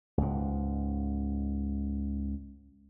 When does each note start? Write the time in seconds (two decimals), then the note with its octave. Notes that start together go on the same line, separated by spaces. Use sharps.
0.18 C#2 G#2